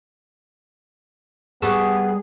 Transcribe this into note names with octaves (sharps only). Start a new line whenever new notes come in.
G3 B3 F#4 G#4 A4 C#6 D#6